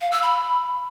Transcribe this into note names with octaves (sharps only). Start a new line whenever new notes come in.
F5
E6
B5